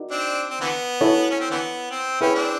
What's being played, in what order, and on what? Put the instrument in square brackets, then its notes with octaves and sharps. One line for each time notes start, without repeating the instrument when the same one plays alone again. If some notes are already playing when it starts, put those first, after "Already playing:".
Already playing: [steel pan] D#4 F#4 A#4 D5
[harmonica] C4 D4
C4
D3 E3 B3
[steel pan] E4 A4 C#5
[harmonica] C#4
C4
D3 E3 B3
C4
[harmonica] C#4 [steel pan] E4 G#4 B4 E5 G5
[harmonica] C4 D4